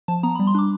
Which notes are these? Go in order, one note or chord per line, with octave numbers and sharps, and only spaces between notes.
F3 A5
B3 A#5
G3 B5
C6
D4 D6